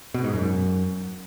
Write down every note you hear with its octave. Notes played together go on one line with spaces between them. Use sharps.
B2
G#2
F#2